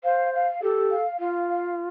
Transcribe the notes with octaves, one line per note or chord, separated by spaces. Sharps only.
C5 F5
F5
G4 A4
F5
F4 F5
F5